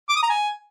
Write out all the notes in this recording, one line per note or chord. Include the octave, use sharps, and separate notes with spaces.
D6
D#6
A#5
G#5